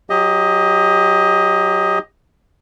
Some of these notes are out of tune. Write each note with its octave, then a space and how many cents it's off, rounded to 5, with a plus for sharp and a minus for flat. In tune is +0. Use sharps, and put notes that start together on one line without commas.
F#3 +0 G4 +30 D#5 +10